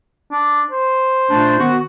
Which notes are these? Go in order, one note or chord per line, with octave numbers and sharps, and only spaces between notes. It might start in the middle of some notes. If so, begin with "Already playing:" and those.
D4
C5
A#2 A3 D4
D#3 B3 F#4